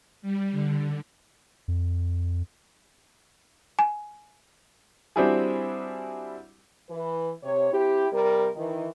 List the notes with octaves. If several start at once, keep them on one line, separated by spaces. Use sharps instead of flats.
G3
D3
F2
G#5
G3 C4 D4 E4 F#4 G#4
E3 B4
C3 C#5
C4 E4 G4
C3 G3 A#4
D#3 E3